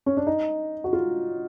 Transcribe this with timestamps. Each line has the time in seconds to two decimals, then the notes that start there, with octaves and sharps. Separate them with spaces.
0.06 C#4
0.17 D4
0.27 D#4
0.84 F#4
0.93 F4